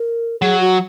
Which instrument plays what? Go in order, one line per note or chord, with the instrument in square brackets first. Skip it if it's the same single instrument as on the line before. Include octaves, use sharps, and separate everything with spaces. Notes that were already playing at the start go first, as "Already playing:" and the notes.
Already playing: [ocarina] A#4
[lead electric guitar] F#3 [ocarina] G#4
[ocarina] F#4